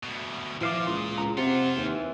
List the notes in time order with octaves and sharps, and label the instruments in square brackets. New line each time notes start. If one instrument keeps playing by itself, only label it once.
[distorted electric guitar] D2 B2
[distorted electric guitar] A#2 [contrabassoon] E3 [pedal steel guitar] F3 F5 D6
[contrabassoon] C#2 [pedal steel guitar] C6 D#6
[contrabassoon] C#2 [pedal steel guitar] A#5
[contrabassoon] C3 [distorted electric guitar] C4 F4 [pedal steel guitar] F#5
[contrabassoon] D#2 [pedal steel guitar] E3